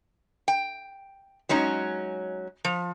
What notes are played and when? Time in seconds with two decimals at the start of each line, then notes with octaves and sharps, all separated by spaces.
0.48 G5
1.49 F#3 G#3 C#4 D#4
2.65 F3